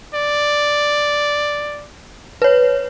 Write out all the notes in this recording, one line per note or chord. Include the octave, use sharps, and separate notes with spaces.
D5
B4 C#5